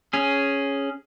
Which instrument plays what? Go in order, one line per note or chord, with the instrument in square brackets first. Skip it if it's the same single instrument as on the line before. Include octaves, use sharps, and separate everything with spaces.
[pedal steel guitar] C#4 G#4